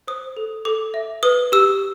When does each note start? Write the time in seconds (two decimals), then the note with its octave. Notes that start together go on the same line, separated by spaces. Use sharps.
0.08 C5 D#6
0.37 A4
0.65 A4 D6
0.94 E5
1.23 B4 D#6
1.52 G4 E6